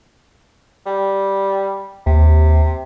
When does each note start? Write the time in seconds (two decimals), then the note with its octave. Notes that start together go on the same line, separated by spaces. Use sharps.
0.86 G3
2.06 D#2 C3